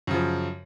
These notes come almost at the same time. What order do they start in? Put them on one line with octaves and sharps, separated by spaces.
F#2 C#3 F3